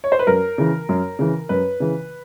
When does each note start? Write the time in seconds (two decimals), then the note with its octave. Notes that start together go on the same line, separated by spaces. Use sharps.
0.04 C#5
0.12 C5
0.19 B4
0.27 F#2 A#4
0.58 C#3 E3
0.89 F#2
1.19 C#3 E3
1.49 F#2 B4
1.80 C#3 E3